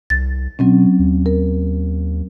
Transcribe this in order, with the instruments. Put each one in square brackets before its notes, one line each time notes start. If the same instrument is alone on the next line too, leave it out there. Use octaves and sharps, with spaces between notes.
[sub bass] C2 [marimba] A6
[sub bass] B2 [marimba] F#3 C4 C#4
[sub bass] D#2
[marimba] A#4